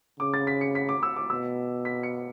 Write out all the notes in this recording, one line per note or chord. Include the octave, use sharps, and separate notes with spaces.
C#3 D6
A6
B6
C#7
B6
D6
E6
D6
B2 E6
B6
C#7